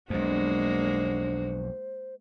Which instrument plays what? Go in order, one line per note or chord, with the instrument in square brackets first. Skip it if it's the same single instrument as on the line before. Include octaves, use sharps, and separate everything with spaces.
[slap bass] B1 F2 [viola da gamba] G#3 A#3 F#4 [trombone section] D4 [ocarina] C5